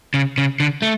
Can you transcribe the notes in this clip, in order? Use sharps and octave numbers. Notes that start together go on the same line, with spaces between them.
C#3
C#3
D3
A3